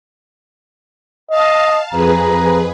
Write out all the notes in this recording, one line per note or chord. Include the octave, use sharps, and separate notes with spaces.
D#5 F5 A5
F2 G#4 B4 A#5